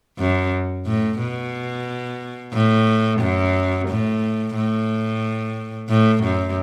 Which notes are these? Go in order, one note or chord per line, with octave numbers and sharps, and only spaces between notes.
F#2
A2
B2
A2
F#2
A2
A2
A2
F#2